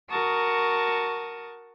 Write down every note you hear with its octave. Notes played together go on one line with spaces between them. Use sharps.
F#4 A#4 A5 C#6 D#6